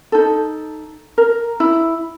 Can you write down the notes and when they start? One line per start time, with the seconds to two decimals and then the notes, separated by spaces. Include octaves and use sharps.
0.12 D#4 A4
1.18 A#4
1.60 E4